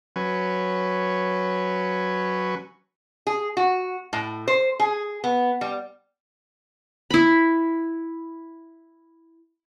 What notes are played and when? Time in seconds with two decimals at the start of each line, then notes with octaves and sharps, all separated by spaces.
0.16 F#3 C#4 B4
3.27 G#4
3.57 F#4
4.13 A2
4.48 C5
4.80 G#4
5.24 B3
5.61 G3
7.11 E4 B5